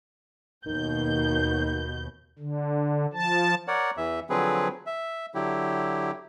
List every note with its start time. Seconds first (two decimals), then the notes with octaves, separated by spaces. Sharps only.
0.66 D#2 B2 D#3 G6
2.39 D3
3.13 F3 A5
3.68 A#4 C#5 D5 F#5
3.97 E2 E3 E5
4.30 D3 F3 F#3 C4 G#4 B4
4.86 E5
5.35 D3 F#3 E4 G4